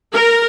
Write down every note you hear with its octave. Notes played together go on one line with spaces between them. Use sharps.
A#4